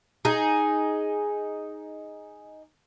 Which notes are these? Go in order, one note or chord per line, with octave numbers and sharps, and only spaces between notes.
D#4 G#4